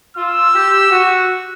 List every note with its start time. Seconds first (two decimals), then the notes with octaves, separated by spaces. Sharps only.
0.17 F4 E6
0.54 G4
0.91 F#4